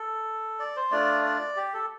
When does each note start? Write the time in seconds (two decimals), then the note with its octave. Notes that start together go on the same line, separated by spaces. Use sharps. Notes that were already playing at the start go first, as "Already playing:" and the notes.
Already playing: A4
0.59 D5
0.76 C5
0.91 A3 D4 F4 D5
1.25 D5
1.56 G4
1.74 A4